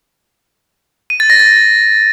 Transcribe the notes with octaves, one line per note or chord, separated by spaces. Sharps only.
D#7
A6
A#6
A6